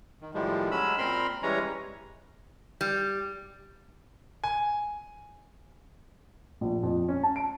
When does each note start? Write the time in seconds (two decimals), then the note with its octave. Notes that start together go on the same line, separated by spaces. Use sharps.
0.21 D#3
0.34 A2 D#3 F3 G3 G#3
0.71 F#3 G#3 C#4 B5 E6
0.98 A#2 C4 A#4 B5 C6 F6
1.43 E3 G3 G#3 C#4 C#5 A#5
2.81 G3
4.44 G#5
6.61 A#1
6.83 F2
7.08 C#4
7.23 A5
7.36 D7